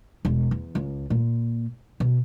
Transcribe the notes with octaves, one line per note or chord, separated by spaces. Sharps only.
E1
E2
C#2
A#2
B2